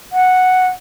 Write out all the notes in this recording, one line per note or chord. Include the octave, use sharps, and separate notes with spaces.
F#5